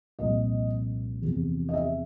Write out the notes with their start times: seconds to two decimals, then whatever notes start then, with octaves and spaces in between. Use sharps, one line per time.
0.19 C2 A#2 F3 D#5
1.22 E2 C3 F3
1.69 D#5
1.74 E5